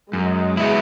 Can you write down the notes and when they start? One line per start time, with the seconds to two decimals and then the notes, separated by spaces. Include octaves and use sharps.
0.13 F#2 G#3
0.57 F#3 B3 E4